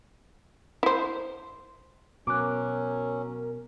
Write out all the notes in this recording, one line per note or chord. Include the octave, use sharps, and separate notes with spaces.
E4 C5
B2 F#3 C#4 A#4 D6 F#6